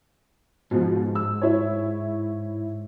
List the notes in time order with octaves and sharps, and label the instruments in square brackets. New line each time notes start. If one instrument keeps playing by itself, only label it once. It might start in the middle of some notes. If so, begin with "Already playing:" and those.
[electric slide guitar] G#2 [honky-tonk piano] B2 F3
[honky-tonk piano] E6
E4 C#5